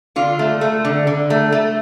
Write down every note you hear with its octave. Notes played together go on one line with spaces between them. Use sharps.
D3 F4
A3
A3
D3
D3
A3
A3